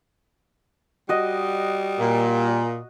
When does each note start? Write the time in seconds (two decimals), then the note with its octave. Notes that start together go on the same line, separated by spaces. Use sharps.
1.09 G3 F#4 D#5
1.99 A#2